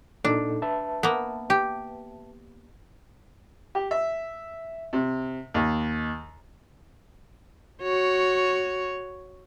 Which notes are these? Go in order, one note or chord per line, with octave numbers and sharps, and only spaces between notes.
A#2 D4 D#4 A4
B4 E5 A5
A#3 B3
G4
G4
E5
C3
D#2
F#4 C#5